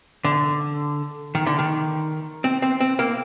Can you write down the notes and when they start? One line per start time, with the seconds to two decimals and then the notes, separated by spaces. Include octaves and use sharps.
0.24 D3
1.35 D#3
1.47 D3
1.59 D#3
2.44 C4
2.62 C4
2.81 C4
2.99 A#3